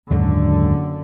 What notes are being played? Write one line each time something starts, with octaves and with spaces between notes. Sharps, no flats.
F#1 D#2 G#2 D3 F#3